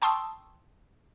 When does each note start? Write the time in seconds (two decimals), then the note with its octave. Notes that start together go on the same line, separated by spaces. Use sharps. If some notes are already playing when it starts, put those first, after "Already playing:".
0.02 G5 A5 C6 C#6 D#6 E6